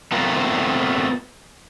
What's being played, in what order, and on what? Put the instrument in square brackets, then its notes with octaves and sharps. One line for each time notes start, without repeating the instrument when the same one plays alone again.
[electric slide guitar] A3 B3 C4 F4 A#4